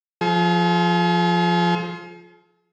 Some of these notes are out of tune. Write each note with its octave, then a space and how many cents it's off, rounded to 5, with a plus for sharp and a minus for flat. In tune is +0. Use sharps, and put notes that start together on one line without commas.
F3 +0 G#4 +45